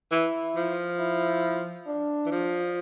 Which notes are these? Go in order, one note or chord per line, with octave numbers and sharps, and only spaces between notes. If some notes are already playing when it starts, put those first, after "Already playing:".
E3 E4
F3
E4
D4
E3
F3